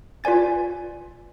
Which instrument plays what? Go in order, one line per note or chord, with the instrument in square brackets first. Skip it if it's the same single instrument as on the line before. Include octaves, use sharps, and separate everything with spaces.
[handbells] F4 B4 D5 G#5 A6